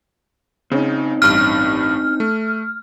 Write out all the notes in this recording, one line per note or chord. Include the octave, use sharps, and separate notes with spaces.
C#3 C4 C#4 D#4
A1 G2 F6
A3